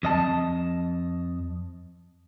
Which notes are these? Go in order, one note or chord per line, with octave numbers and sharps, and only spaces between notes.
F2 D#5 A5